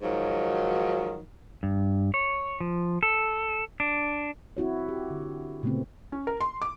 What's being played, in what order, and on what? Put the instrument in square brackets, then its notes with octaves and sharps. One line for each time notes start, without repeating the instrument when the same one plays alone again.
[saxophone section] G#2 D#3 F3 F#3
[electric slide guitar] G2
C#5
F3
A4
D4
[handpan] C4 E4 F#4 C#5
G4
D3
A#2 C#3 A3 B3 C4
[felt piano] C#4
A#4
C6
D6